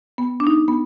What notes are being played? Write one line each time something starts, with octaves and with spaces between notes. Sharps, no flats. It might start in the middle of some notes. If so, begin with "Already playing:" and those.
B3
D4
D#4
B3